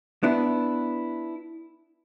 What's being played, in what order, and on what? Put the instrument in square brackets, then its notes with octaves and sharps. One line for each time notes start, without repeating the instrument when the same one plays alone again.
[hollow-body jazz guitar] B3 D4 E4